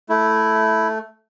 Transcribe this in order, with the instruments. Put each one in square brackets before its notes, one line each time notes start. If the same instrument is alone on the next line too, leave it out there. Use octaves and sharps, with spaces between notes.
[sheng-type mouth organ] A3 [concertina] E4